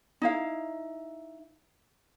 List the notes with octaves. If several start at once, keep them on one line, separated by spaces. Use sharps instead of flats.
D#4 E4 F5